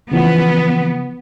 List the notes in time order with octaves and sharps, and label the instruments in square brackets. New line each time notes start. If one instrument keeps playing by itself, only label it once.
[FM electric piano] C#3 E3 F3 [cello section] B3